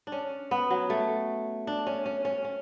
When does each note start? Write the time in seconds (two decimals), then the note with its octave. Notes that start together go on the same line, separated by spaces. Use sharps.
0.07 D4
0.12 C#4
0.51 B3
0.70 F#3
0.90 A3
1.67 D4
1.87 C#4
2.06 C#4
2.25 C#4
2.44 C#4